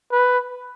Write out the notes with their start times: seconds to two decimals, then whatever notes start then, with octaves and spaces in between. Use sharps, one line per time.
0.12 B4